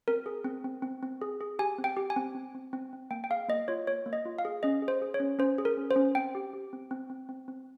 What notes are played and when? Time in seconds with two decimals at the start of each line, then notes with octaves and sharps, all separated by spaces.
0.08 C4 A#4
0.26 G#4
0.44 C4
0.64 C4
0.82 C4
1.03 C4
1.22 G#4
1.41 G#4
1.59 G4 G#5
1.78 C4
1.84 G5
1.97 G4
2.10 G#5
2.16 C4
2.35 C4
2.55 C4
2.73 C4
2.93 C4
3.11 A#3 G5
3.24 G5
3.30 G#4 F5
3.49 A#3 D#5
3.68 F4 C#5
3.87 A#3 C#5
4.06 A#3
4.13 D#5
4.25 F4
4.38 F5
4.45 G#4
4.63 C#4 D#5
4.82 G#4
4.88 C5
5.02 G#4
5.14 C#5
5.20 C#4
5.39 C#4 C5
5.58 G#4
5.65 A#4
5.77 C#4
5.91 C5
5.96 C#4
6.15 C4 G5
6.35 G4
6.54 G4
6.73 C4
6.91 C4
7.10 C4
7.29 C4
7.48 C4